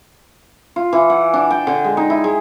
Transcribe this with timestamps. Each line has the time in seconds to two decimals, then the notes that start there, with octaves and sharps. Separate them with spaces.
0.76 F4
0.93 E3
1.10 F#5
1.34 D4
1.50 G5
1.67 D3
1.84 G#3
1.97 D#4
2.10 E4
2.24 G#3